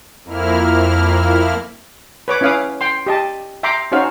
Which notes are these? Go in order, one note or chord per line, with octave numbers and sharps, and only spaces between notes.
F2 A#3 E4 F6
B4 C#5 D6
C#4 E4 B4 F5 D6 D#6
G5 C6
G4 D#5 A5
E5 G5 A#5 C6 D6
C#4 D#4 F#4 C5 F5